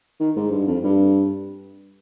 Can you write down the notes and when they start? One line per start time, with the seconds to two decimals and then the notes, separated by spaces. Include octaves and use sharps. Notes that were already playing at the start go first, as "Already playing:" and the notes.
0.20 D#3
0.36 G#2
0.51 G2
0.67 F2
0.84 G2